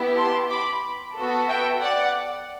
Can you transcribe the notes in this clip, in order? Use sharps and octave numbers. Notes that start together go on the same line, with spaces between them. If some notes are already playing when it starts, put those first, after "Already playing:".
Already playing: B3 E4 G4
A5 C6
B5 D6
B3 F#4 A4
E5 G5
D5 F#5